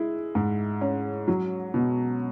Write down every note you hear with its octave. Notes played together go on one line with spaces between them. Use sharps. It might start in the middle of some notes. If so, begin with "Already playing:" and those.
Already playing: G#3 E4
G#2
C#4
F#3
B2